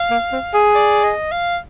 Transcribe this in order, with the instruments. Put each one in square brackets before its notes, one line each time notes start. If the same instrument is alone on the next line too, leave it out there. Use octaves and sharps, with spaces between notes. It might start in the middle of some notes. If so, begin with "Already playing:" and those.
Already playing: [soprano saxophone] F5
[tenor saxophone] A#3
C4
G#4
[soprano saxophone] D5
D#5
F5